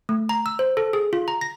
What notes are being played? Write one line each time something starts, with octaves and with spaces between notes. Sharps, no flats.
A3
A#5
E6
C5
A4
G#4
F4
A#5
A#6